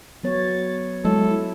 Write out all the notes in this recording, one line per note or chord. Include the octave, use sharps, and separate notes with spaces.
F#3 B3 C#5 A6
F#3 G#3 E4 A4